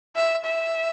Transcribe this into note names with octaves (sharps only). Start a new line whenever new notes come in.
E5
E5